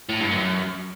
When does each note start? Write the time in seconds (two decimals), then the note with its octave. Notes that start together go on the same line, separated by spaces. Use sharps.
0.09 A2
0.20 G2
0.31 F#2